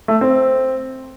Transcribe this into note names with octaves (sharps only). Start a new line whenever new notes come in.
A3
C4